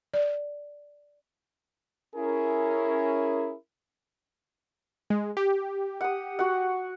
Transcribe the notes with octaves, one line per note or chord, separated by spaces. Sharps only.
D5
C#4 E4 G#4 A#4
G#3
G4
F#5 D#6
F#4 F#5